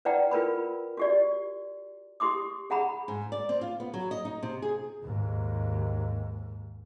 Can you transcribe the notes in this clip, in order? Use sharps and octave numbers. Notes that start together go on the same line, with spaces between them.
B4 D5 F#5 G5 A#5
F4 A#4 B4 B5
F#4 G4 D5
G4 C6 D6 D#6
G#4 F#5 A#5 B5
G#2
D5
C4
F4
B3
F#3
D#5
D#4
C3
G#4
D#2 G#2